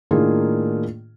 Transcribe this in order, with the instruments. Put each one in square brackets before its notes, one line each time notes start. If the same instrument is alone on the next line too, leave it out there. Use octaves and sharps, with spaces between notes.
[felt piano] A2 D#3 A#3 D4 F4 G#4